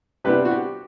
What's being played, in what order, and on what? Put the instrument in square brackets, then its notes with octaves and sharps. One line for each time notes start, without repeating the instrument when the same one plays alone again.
[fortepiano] C3 G3 B3 D4 G4 B4
F#4
G4